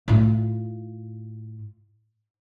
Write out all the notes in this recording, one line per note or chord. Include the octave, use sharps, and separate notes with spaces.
A2 F4